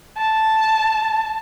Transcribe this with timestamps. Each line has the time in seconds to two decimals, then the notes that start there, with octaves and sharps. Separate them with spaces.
0.18 A5